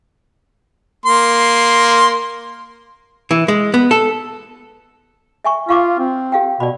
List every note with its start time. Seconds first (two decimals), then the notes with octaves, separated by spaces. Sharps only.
1.06 A#3 C6
3.31 E3
3.48 G#3
3.74 B3
3.91 A4
5.44 E5 G#5 C#6
5.69 F4 F5 C#6 D6
5.99 C4
6.32 G4 F5 G5
6.60 B2 D5 B5